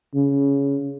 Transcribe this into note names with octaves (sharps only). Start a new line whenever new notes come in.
C#3